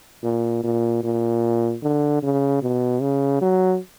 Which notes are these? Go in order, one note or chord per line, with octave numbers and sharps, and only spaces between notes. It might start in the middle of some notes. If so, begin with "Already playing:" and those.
A#2
A#2
A#2
D3
C#3
B2
C#3
F#3